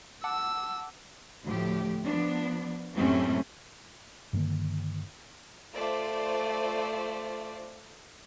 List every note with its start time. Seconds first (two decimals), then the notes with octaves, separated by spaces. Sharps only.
0.24 F#5 A5 D6 E6
1.45 D2 A2 F3 G4
2.07 F3 B3 D4
2.95 F#2 A2 C3 A3 C4 C#4
4.33 G2 D3 D#3 A#3
5.74 A3 F4 C5 D5